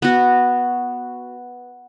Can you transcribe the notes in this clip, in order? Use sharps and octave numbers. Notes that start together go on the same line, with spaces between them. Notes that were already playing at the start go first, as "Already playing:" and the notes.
B3 F#4